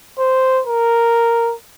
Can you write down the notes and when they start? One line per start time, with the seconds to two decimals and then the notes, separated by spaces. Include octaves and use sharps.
0.19 C5
0.67 A#4